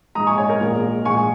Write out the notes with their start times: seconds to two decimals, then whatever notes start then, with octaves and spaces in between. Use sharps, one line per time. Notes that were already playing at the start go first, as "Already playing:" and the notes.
0.15 A#1 G#2 G#3 A#5 D#6
0.27 G#5 C#6
0.38 C#5
0.49 A#4
0.60 A#1 A#2 G#3
1.05 A#1 G#2 G#3 G#5 C#6